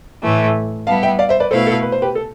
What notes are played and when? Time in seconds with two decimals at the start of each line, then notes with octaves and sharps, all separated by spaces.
0.23 A2 E3 A3
0.87 G3 B3 E4 F5 A5
1.03 E5 G5
1.19 D5 F5
1.29 C5 E5
1.40 B4 D5
1.51 B2 A3 E4 A4 B4 C5 F5
1.67 A4
1.83 B4
1.92 C5
2.02 G4 B4
2.15 A4